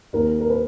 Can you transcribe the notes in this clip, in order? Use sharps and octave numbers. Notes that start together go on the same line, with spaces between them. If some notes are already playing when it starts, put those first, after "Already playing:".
D#2 A#4
A#4
B4